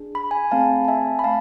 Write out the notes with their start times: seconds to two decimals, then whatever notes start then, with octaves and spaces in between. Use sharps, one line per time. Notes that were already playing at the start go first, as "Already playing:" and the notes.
Already playing: D4 G#4
0.15 B5
0.30 G#5 B5
0.51 A3 C4 G#4 F5 A5
0.85 A5
0.88 E5 G#5
1.19 B5
1.24 A3 C4 F5 A5